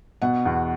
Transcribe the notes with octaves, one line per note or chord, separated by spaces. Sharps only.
B2 F#5
E2